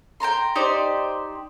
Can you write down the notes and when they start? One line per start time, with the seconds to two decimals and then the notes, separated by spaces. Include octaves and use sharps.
0.20 G5 A5 A#5 C6
0.55 D#4 G4 C5 D5